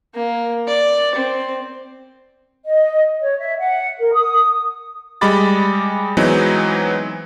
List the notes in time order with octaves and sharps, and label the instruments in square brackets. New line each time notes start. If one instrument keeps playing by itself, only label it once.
[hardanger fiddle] A#3
D5
C4
[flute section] D#5
C#5
E5
F#5
A#4
D#6
[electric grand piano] G3 G#3 D#5 B5 D6 A6
E3 F#3 G#3 B3 C4 D#4